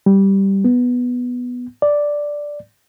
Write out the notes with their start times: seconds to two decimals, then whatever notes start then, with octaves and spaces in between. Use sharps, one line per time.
0.06 G3
0.65 B3
1.82 D5